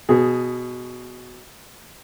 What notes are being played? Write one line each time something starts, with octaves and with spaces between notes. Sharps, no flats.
B2 G#4